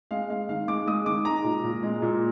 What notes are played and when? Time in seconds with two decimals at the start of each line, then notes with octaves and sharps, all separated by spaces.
0.11 G#3 F5
0.30 G#3 F5
0.49 D#3 F5
0.68 G#3 D6
0.87 G#3 D#6
1.06 D#3 D6
1.25 G#3 A#5
1.44 A#2
1.64 A#2
1.83 G#3
2.02 A#2